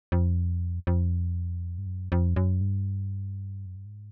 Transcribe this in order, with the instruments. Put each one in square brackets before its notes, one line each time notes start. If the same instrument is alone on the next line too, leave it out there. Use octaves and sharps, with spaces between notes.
[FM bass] F2
F2
G2
F#2
F2
F#2
G2
F#2
G2
G#2